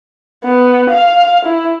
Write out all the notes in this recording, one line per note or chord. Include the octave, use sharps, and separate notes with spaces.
B3
F5
E4